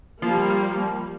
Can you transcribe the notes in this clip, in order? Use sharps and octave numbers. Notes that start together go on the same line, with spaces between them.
F3 G3 A#3